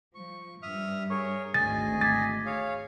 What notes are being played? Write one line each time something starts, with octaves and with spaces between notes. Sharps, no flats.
F3 C#6
G2 E5 D#6 F6
G#4 A#4 C#5 C#6
G#1 D2 G#4 D#5 G#5 A6
D6 G#6 A6 B6
G#4 C#5 F5